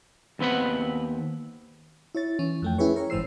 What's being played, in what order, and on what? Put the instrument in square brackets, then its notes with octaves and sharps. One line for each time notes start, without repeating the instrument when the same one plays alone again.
[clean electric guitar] D#2 B3 C4 B4 F#5
[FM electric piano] E4 C#5 A6
E3 C#4
F2 A3 G5
C#4 E4 G#4 B4 C#5
A#4 C#5
G1 G#2 E3 C5 E6 C7